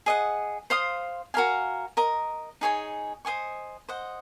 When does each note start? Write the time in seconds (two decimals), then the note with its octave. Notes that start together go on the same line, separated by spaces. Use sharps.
0.06 G#4 D#5 F#5
0.70 C5 F5 C6 D#6
1.34 F#4 A#4 F5 G#5
1.97 A#4 D#5 A#5
2.61 D#4 G#4 C#5 G#5
3.25 C5 D#5 G#5 C#6
3.89 C5 D#5 F#5